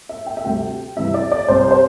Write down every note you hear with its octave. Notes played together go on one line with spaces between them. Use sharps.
E5
G5
E5
D2 C3 G3 G5
D2 C3 E3 G3 E5
D5
D5
C2 C3 G3 C5
C5